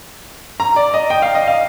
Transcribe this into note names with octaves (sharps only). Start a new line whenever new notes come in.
A#5
D5
D#5
G5
F5
D#5
F5